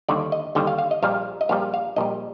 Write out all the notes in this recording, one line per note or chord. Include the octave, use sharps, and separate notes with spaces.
D#2 D3 G3 D5
D#5
D#2 D3 G3 G5
F5
F5
D#5
A#1 A#2 G3 F5
D#5
A#1 A#2 G3 F5
F5
A#1 A#2 G3 D#5